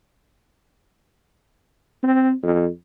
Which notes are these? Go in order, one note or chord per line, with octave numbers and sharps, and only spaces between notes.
C4
F2